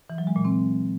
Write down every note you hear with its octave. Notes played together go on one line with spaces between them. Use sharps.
E3
F#3
G#3
A#2
C4